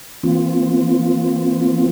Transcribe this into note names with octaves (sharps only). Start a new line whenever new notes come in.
E3 A#3 C4 F4